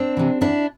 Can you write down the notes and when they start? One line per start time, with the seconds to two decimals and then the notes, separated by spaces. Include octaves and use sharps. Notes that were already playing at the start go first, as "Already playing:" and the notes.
Already playing: C4 D4
0.17 C3 E3
0.41 E2 D4 E4